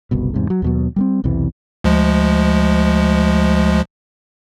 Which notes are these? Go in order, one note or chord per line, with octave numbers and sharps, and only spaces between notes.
F#1 C2 B2
E2 G#2 C3
F#3
D#2 B2 F#3
G3 A3 C4
B1 E2 C3 E3
D2 F3 G#3